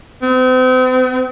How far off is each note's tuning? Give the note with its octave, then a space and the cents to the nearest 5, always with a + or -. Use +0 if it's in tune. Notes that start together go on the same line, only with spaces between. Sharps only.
C4 -40